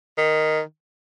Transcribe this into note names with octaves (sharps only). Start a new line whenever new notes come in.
D#3